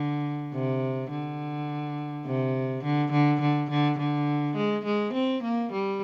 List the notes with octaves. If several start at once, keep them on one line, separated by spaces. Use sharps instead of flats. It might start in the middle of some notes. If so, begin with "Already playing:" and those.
Already playing: D3
C3
D3
C3
D3
D3
D3
D3
D3
G#3
G#3
C4
A#3
G3